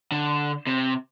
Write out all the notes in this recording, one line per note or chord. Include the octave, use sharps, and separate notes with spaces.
D3
C3